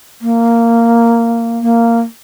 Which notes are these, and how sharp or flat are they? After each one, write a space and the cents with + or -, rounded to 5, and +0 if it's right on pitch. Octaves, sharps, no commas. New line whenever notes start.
A#3 -10
A#3 -10